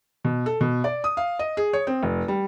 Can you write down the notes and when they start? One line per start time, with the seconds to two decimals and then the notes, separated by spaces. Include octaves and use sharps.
0.24 B2
0.46 A4
0.61 B2
0.84 D5
1.04 D#6
1.17 F5
1.39 D#5
1.57 G#4
1.73 C#5
1.87 C4
2.03 F1
2.28 G3